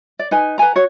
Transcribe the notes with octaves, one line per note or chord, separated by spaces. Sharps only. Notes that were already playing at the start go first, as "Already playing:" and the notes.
D5
D#4 B4 G#5
B4 F#5 G#5 A#5
F#4 C#5